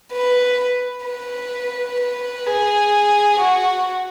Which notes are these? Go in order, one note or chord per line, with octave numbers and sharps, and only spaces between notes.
B4
B4
B4
G#4
F#4